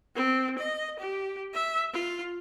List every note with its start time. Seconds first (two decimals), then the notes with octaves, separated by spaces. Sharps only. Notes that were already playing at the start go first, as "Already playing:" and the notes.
0.15 C4
0.58 D#5
0.99 G4
1.54 E5
1.93 F4